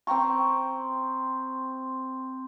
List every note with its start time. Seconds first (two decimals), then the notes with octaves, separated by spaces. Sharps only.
0.07 C4 G5 A#5 C#6